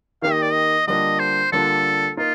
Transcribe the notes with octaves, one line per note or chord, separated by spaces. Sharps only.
D#3 A#3 D#4 G4 F5
D#5
D5
D#5
D3 G3 A#3 D4 F4 D#5
C5
D3 G3 A#3 D4 F4 A4
A#3 D#4 F4